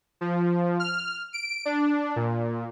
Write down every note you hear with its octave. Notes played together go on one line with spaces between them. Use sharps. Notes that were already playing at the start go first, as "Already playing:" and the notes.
F3
F6
D7
D4
A#2